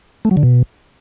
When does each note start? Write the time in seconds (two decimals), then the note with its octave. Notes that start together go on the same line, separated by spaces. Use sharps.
0.25 A3
0.31 F#3
0.37 D3
0.43 B2